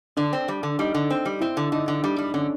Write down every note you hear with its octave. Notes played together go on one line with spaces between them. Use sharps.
D3 D4
C4
G3
D3
G3 D#4
D3
C4
G3
C4 E4
D3
D3 D#4
D3
G3 D4
G3
D3 C#4